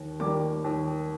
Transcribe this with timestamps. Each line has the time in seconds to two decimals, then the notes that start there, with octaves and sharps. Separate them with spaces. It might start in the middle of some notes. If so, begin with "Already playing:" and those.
Already playing: D#2
0.20 D#3 G3 A#3 D6
0.64 D#2